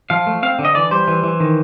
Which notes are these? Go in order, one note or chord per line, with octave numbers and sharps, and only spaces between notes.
F3 F5
A3
C4 F5
D3
D#5
E3 D5
G3 C5
E3
E3
D#3